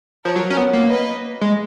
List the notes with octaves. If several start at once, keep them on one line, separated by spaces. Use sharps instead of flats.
F3 A#4 C#5
F#3
C#4
B3
A#3
B4 D#5
G#3